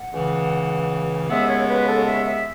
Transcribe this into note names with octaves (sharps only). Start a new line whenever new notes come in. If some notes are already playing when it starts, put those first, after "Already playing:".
Already playing: F#5
C#2 C#3 E3
D#2 C#3 G#3 B3 E5
C#5
B4
A4
E5
E5